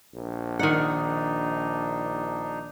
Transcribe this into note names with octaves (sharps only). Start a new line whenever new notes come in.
A#1
D#3 D4 D#4 F#5